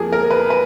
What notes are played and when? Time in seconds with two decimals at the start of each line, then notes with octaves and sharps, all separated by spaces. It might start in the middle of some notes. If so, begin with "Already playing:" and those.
Already playing: F2 F3 A#3 G#4
0.13 A#4
0.31 B4
0.50 B4